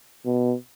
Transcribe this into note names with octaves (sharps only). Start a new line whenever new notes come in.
B2